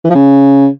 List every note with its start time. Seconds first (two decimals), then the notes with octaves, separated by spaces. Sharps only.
0.05 E3
0.10 F3
0.15 C#3